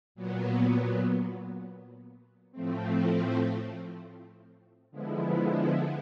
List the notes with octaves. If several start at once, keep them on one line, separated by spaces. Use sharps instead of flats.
A#2 F#3 B3
A2 F3 A3 C4
D3 F3 G#3 B3 E4